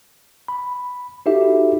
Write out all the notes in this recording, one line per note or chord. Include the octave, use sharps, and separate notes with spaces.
B5
D#4 E4 F#4 G4 A4 E5